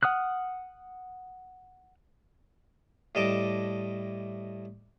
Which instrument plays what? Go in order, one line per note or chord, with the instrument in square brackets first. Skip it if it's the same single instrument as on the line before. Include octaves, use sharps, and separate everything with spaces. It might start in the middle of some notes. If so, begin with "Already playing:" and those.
[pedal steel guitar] F#5 D#6 F6 F#6
[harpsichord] A2 G3 D#5 A5 D6